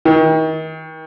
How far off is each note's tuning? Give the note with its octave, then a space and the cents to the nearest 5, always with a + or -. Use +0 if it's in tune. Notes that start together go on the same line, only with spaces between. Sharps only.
D#3 +35